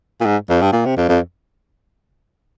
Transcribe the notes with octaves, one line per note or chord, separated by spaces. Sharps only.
A#2
G#2
F2
G2
A#2
C3
F2
F2